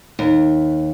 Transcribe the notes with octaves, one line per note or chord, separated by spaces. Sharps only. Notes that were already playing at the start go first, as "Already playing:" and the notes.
D#2